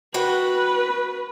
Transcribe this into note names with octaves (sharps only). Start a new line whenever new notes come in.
F#4 B4 G5